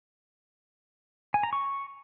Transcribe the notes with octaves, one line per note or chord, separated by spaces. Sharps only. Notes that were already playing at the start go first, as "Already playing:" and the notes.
G#5
A#5
C#6